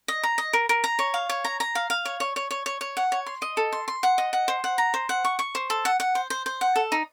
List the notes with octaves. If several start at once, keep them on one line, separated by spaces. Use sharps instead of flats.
D#5
A#5
D#5
A#4
A#4
A#5
C#5
F5
C#5
A#5
A#5
F5
F5
C#5
C#5
C#5
C#5
C#5
C#5
F#5
C#5
C6
D#5
A4
C6
C6
F#5
D#5
F#5
C5
F#5
A#5
C5
F#5
C#6
C#6
C5
A4
F#5
F#5
C5
C5
C5
F#5
A4
D#4